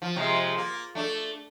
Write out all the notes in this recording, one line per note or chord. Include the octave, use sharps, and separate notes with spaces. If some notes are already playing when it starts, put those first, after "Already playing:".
F3
C3 F3 G#3
A#3
A3 D4